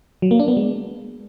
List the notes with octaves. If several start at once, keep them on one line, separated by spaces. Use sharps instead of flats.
F#3
A#3
D4
B3
G#3